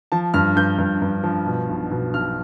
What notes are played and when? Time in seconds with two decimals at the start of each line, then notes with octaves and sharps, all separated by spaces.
0.12 F3 A5
0.34 G2 F6
0.57 G2 G6
0.79 G2
1.02 G2
1.23 F3
1.46 B2
1.69 B1
1.91 B2
2.14 B1 F6